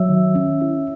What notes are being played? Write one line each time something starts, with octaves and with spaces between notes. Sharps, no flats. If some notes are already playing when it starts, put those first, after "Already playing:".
Already playing: F#3 C#5 E5 E6
D#3
C#4
E4